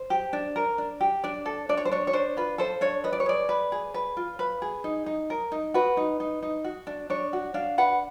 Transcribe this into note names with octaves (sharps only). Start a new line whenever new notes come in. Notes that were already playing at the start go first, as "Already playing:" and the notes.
Already playing: C5
G4
D4
A#4
D4
G4
D4 D5
A4
D4 D5
C#5
C5
D4 C#5
C#5
D4 C5
F4 B4
A4 C5
D4 C#5
B4 D#5
D5
C#5
G#4 D5
B4
G#4
B4
F4
B4
G#4
D#4
D#4
A#4
D#4
F#4 B4
D#4
D#4
D#4
F#4
D4
D4 C#5
F#4
D4 F5
B4 F#5